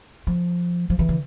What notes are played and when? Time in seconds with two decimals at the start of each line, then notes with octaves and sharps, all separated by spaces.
0.27 F3
0.90 F3
0.99 E3
1.09 D3